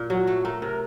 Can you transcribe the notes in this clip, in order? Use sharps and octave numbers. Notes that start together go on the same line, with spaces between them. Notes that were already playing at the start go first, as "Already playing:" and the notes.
Already playing: A#2
F#3 F#4
A3
A3 A#4
C3 A#4